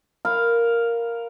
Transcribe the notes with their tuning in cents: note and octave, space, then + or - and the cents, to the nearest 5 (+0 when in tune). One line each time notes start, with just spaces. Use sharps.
A#4 +0 F5 +0 B5 +15